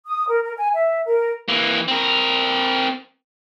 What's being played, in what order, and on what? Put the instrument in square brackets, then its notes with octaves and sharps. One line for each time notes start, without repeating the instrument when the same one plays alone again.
[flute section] D#6
A#4
A#4
G#5
E5
A#4
[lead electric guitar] E3 A#3
C4 A#4